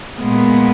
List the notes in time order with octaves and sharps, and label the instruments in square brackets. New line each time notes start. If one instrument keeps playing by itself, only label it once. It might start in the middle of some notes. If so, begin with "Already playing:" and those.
[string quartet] A#2 G#3 B3